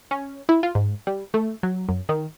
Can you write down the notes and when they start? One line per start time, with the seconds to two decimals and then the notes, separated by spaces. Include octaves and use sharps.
0.11 C#4
0.49 E4
0.63 F4
0.75 G#2
1.07 G3
1.34 A3
1.63 F#3
1.89 F#2
2.09 D#3